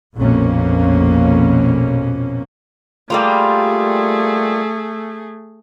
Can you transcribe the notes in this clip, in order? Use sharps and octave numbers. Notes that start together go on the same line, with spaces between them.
A#1 F2 B2 A#3 C#4
G3 A3 A#3 F4 G#4